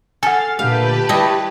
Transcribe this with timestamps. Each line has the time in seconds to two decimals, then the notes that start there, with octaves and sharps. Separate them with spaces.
0.23 A4 F#5 G#5 F6 A6 C7
0.59 A#2 D3 A3 G4 B4 F5 A5
1.09 G3 E4 D#5 C#6 G#6